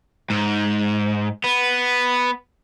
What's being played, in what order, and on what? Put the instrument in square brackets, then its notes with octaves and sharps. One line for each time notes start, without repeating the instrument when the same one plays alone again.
[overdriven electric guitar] G#2
B3